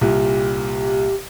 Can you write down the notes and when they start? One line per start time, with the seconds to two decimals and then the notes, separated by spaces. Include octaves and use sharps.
0.01 C2 A#2 G4